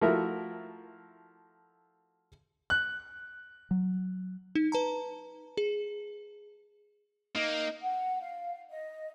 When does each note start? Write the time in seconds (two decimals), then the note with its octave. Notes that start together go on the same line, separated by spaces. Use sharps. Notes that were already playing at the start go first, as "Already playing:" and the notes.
0.01 F3 A3 E4 F#4 A#4 E5
2.70 F#6
3.71 F#3
4.55 D#4
4.72 B4 A5 A#5
5.57 G#4
7.35 A#3 D#4
7.82 F#5
8.21 F5
8.71 D#5